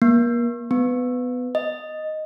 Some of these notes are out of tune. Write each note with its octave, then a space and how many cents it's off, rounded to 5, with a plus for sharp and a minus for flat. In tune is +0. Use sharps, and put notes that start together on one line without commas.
A#3 +35
B3 +15
D#5 -5